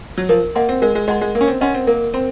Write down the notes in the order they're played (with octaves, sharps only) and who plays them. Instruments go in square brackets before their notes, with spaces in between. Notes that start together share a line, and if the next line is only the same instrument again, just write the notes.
[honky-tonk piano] F#3
[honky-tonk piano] F3 [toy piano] A#4
[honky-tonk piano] A#3 [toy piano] D#5 F#5 C6
[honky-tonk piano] C4
[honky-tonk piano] G#3 [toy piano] A#4
[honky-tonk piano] G#3
[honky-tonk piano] G#3 [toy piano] D#5 F#5 C6
[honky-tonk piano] G#3
[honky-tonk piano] A#3 [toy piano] A#4
[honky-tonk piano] C#4
C4
[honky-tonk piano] C#4 [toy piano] D#5 F#5 C6
[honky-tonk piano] C4
[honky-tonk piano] A#3 [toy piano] A#4
[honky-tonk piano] C4 [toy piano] C6